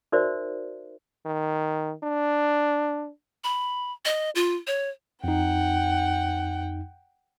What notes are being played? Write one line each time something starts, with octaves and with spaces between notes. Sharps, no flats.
D#4 F#4 A#4 C5 D5 E5
D#3
D4
B5
D#5
F4
C#5
F2 D#4 F#5 G5